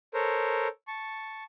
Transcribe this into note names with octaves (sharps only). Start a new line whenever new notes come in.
A4 A#4 C5 C#5
A5 C#6